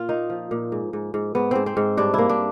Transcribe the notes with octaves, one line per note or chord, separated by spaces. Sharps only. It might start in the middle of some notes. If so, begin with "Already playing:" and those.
Already playing: A#2 F4
A#3 D#4
F3
A#2
G#2
G#2
G#2
G#2 B3
G#2 C4
C4
G#2
G2 D4
A#3 E4
D4